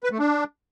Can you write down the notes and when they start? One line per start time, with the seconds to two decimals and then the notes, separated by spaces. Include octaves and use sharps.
0.04 B4
0.11 A3
0.19 D4